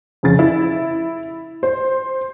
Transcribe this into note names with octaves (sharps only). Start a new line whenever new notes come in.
F2 C#3 A6
E4
C5